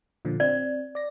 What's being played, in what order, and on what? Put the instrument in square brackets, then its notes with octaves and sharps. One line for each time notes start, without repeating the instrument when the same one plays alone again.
[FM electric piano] A#2 D3 F3
[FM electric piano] C4 [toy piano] D5
[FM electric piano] D5 A#6